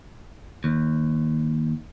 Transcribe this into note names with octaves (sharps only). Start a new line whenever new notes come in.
D#2